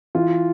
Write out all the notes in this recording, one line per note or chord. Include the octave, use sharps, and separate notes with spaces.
E3 F4